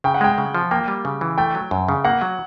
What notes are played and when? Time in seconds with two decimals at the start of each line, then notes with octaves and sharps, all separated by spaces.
0.04 C#3 G5
0.14 F#5
0.21 G#3 G5
0.38 C#3
0.55 F3
0.71 A#3 G5
0.88 G3
1.05 C#3
1.21 E3
1.38 A3 G5
1.55 F#3
1.71 F#2
1.89 C#3
2.05 A#3 F#5
2.22 F#3